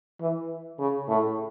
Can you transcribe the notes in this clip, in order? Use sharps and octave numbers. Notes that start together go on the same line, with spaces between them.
E3
C#3
A2